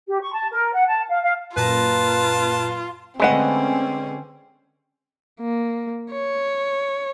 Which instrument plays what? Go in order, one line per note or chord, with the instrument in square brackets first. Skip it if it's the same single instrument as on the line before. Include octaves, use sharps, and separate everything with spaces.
[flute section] G4
C#6
A5
A#4
F#5
A5
F5
F5
[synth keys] F#2 A#2 A#5 [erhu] F4 [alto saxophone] B4 [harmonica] A5
[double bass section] D3 C#4 [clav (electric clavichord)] G#3 B4 [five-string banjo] A3 D#5 F#5 [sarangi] C4
[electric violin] A#3
C#5